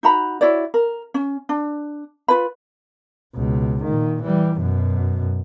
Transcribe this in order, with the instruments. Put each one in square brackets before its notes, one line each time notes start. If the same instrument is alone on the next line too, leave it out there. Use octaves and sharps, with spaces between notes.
[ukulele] D#4 F#4 A#5 B5
E4 F#4 C#5 D5
A#4
C#4
D4
F4 B4 B5
[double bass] C#2 B2
A#2 D#3
E3 G3
F#2 B2